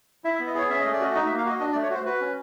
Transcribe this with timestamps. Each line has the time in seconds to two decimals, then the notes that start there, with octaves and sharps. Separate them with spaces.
0.24 E4 E5
0.35 E5
0.40 B3
0.47 D#5
0.55 G#4 C#5
0.70 C#4 E5
0.80 A3 D#5
0.93 D5
1.00 F#4 D#5
1.15 D#4 D#5
1.26 E5
1.31 A#3
1.38 F5
1.45 F#4 D#5
1.60 D4 D#5
1.72 D5
1.75 A3
1.83 C#5
1.90 F#4 C5
2.06 F#4 B4
2.21 C#4